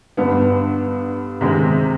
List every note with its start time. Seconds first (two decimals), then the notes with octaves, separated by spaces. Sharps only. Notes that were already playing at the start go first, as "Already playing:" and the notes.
0.17 G2 D3 G3 B3
1.41 C3 D#3 G#3 C4